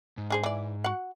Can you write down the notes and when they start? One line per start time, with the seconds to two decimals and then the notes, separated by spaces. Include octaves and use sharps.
0.18 G#2
0.30 D4 G#4 C5
0.43 E3 D5
0.84 F#4 F#5